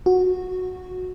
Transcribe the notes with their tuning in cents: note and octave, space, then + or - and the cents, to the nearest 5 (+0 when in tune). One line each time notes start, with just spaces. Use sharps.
F#4 -10